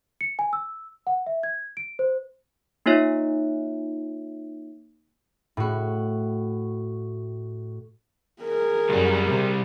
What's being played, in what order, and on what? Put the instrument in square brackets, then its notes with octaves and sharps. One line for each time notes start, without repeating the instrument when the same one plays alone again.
[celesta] C#7
G#5
E6
F#5
E5
G#6
D7
C5
[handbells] A#3 D#4 F4 C#5 E5
[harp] A2 F#4
[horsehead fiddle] G#4 A#4
[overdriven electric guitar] C2 G3 [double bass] F#2
[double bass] C3